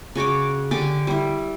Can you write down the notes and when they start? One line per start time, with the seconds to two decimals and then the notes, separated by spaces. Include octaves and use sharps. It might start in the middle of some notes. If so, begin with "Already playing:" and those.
0.15 C#3 F#4 C#5 D6
0.71 D3 G4 G#5 D6
1.07 G3 E4